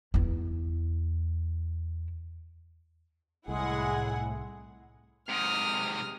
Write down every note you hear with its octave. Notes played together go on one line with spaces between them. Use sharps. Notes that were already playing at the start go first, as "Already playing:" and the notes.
E2 E4
C2 A2 G#3 E4 G#4 F#5
G#2 C3 D#6 F6